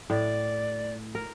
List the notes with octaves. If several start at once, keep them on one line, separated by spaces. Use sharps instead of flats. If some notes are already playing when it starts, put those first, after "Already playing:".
A2 D5
A#4